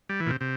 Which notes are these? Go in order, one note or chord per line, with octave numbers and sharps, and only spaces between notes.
G3
E3
A#2
C3
C3